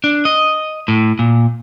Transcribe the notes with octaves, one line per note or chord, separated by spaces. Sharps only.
D4
D#5
A2
A#2